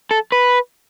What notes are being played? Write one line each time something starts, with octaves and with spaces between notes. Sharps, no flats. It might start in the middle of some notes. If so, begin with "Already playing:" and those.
A4
B4